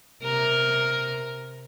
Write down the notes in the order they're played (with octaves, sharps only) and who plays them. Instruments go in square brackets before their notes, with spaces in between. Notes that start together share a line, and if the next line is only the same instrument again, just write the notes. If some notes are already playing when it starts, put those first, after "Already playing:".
[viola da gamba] C3 A#4